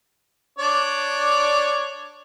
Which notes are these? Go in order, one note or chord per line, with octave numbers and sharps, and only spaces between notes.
D4 C#5 D5